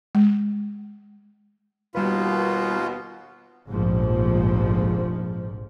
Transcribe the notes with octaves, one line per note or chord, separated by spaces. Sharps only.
G#3
D#2 B2 G3 F4 B4
F1 A#1 G#2 F3